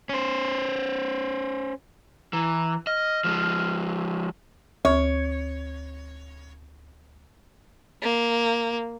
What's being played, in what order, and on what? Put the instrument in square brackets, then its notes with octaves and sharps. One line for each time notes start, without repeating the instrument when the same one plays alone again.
[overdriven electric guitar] C#4 C5
[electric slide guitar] E3 [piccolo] A#5
[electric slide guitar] D#5 [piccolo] F6
[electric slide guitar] F3 G#3
[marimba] D2 [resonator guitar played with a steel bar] C#5
[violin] A#3